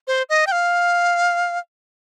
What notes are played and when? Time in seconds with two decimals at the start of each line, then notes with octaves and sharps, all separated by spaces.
0.07 C5
0.29 D#5
0.47 G5
0.52 F5